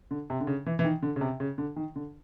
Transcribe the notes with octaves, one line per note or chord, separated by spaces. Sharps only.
D3
C3
D3
C#3
E3
E3
D#3
D3
C#3
C3
C#3
D3
D#3
D3